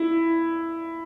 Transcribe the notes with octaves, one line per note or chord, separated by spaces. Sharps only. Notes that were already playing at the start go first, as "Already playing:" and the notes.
Already playing: E4